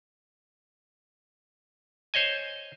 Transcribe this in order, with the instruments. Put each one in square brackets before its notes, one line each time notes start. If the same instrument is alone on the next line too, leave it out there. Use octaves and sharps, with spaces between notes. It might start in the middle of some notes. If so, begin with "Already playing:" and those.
[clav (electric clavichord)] C5 C#5 D#5 G#5